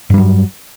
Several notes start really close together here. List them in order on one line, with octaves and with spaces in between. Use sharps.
G2 G3 F#3